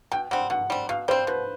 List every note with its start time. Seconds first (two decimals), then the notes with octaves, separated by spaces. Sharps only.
0.12 B2 G5
0.31 G3 C4 F#5
0.50 B2 F#5
0.70 G3 C4
0.89 B2 F5
1.08 G3 C4 C5
1.27 B2 B4